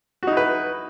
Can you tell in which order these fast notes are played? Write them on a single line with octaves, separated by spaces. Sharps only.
F#4 D#4 E4 B4